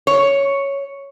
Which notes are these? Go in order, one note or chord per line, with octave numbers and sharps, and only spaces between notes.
C#5